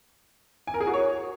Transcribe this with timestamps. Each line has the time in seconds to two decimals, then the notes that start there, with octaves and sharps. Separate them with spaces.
0.67 G#5
0.74 A#4
0.81 G#4
0.87 F#4
0.94 C#5